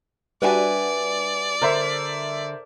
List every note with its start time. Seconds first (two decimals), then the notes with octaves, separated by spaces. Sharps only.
0.42 G3 D4 F#4 B4 D5 E5 G#5
1.62 D3 A#4 C5 E5